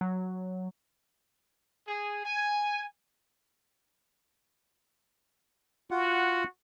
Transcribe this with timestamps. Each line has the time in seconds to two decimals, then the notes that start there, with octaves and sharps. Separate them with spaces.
0.01 F#3
1.87 G#4
2.24 G#5
5.91 F4 F#4 F#5